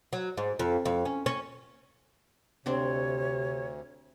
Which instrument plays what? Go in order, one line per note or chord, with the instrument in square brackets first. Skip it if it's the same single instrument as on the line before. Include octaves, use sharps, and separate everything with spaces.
[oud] F#3
G#2
F2
F2
C#4
C#4
[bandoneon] D2 [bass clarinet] C3 [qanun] C4 D4 [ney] C#5